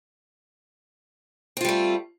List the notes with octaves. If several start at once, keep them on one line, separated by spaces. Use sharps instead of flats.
G3 A3 C4 F4